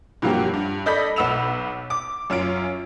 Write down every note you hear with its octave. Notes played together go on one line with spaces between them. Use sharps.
G2 F3 F#3 A#3 F#4 G4
G2
A4 D5 D#5 B5 G6 B6
B1 B4 F#5 E6 E7 F7
D6
F#2 C#4 F4 D7